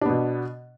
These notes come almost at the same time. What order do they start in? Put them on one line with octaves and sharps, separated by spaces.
D4 B3 B2